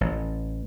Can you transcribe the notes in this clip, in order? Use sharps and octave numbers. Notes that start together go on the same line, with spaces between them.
A1